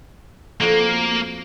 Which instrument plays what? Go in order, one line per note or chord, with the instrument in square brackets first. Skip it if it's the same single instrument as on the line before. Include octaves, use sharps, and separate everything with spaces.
[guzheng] F2 F#4 G5 [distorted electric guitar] A#3